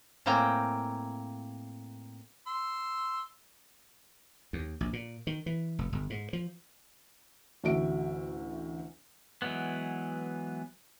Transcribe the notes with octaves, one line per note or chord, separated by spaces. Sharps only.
A2 A#3 C4 A#4 G5 G#5
C6 E6
D#2
A#1
A#2
D#3
E3
F1
G1
G#2
F3
A1 D2 F#4 E5 D7
E3 F#3 G#3 B3